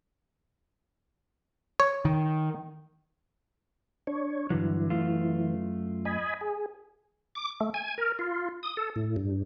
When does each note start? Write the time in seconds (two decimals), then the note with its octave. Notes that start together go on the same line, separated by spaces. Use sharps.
1.80 C#5
2.05 D#3
4.07 D4 C#5
4.50 G2 D3 E3 F#3
4.90 F#2 A3 F4
6.05 D#5 G#5 B5
6.41 G#4
7.35 D6
7.60 A3
7.74 G#5
7.98 A#4
8.19 F4
8.63 D#6
8.77 A4
8.96 A2
9.16 G2